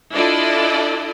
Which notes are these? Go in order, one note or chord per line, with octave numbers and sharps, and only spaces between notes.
D4 E4 F4 A4 D5 D#5